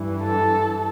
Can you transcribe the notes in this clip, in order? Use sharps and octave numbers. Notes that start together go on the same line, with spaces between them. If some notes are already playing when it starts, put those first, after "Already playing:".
Already playing: G2 E3
A4